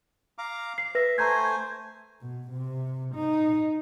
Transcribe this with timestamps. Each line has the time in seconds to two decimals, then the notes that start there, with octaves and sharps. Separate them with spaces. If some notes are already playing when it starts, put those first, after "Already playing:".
0.38 F5 A#5 D6
0.78 C7
0.95 B4 E5 A#6
1.18 A3 C5 G#5 A#5 G6 G#6
2.21 B2
2.51 C3
3.15 D#4